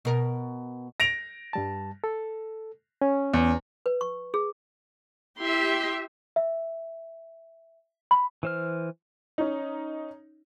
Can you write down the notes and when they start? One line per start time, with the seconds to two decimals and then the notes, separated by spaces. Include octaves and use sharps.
0.05 B2 A#4
1.00 A#6 D7 F7
1.53 G2 G3 A5
2.04 A4
3.02 C#4
3.34 E2
3.86 B4
4.01 C#6
4.34 G#4
5.39 E4 G4 E5 C6
6.36 E5
8.11 B5
8.43 E3 C5 F6
9.38 C#4 D#4